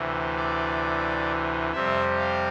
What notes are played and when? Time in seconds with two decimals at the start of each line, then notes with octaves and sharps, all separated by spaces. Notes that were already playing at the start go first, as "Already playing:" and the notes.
Already playing: D2 C3 E3
0.36 D5
1.72 F2 C3 G3 C4 E5
2.19 F5